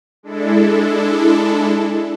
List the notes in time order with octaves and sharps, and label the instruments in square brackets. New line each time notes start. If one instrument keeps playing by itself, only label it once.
[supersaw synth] G#3 D4 E4 A4